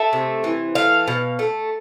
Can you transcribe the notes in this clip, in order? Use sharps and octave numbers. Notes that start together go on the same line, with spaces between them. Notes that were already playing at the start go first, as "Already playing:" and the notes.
Already playing: A3 E5
C3
E3
A3 F5
B2
A3